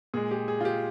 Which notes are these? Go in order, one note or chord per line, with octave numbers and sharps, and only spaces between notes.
A#2 G#3 G#4
G4
G#4
F4
G4